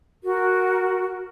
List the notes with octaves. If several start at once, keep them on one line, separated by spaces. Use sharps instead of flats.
F#4 A#4